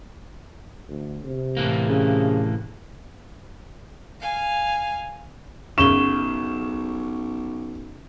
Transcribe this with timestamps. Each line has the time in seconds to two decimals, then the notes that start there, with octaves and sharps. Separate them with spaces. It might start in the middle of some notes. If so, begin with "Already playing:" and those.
0.89 D2
1.24 C3
1.57 A2 E3 A#3
1.89 C#3
4.20 F5 G#5
5.78 B1 F#2 C#3 C#6 E7 G7